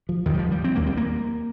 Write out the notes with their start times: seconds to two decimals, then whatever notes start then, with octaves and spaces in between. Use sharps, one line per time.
0.09 F3
0.26 D#2 D#3
0.34 G3
0.39 F3
0.51 G3
0.64 C4
0.76 D#2 A#3
0.86 G3
0.97 A#3